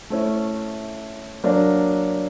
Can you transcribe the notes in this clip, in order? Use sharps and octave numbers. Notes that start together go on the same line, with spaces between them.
A3 C#4 E4
F#3 A#3 D4